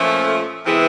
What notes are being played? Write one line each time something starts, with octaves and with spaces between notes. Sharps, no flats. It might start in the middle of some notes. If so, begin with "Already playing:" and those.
Already playing: A#2 F3 A3 C#4
C3 E3 G#3 B3